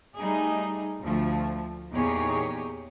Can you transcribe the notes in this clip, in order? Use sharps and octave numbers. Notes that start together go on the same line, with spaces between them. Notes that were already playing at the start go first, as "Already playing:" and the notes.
G3 A3 D#4 G#4
D2 F3 A3
E2 A#2 D#4 G4 G#4 C#5